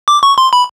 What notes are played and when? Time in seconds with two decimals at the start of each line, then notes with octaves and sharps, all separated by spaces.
0.08 D6
0.23 C#6
0.38 C6
0.53 B5